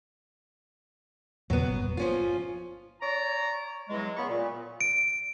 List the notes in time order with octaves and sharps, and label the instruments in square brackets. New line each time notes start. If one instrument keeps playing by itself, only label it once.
[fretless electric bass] E2 A#2 C#3 [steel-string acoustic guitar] F#3 B3
[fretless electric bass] G1
[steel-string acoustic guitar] F3 C#4 F4
[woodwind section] C#5 D5 A#5
E2 E3 F#3 G#3
C#2 C#3 B3 B5 C#6
A#2
[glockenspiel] D7